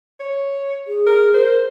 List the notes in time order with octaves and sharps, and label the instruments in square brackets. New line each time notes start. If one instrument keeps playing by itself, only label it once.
[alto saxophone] C#5
[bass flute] G#4
[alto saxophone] A#4
[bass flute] A#4 [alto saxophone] C5